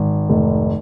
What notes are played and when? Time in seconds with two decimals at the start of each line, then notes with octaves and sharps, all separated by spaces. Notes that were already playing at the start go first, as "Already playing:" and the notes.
Already playing: G#1
0.29 F1